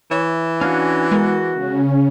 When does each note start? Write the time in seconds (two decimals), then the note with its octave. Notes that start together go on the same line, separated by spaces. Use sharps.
0.11 E3 C#5 E5
0.61 C#4 D4 F#4 F5
1.11 G#3 B3 F#4 A#4
1.52 C#3 C#4